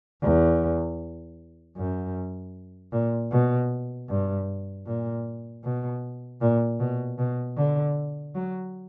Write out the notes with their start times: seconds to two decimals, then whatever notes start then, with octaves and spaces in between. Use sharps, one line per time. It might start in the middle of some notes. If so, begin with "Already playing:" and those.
0.21 E2
1.76 F#2
2.92 A#2
3.31 B2
4.09 G2
4.86 A#2
5.64 B2
6.41 A#2
6.79 B2
7.18 B2
7.57 D3
8.35 F#3